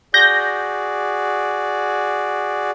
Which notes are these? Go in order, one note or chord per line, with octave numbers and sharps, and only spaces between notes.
F#4 G#4 D5 G6 A#6